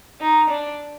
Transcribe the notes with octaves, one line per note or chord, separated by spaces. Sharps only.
D#4
D4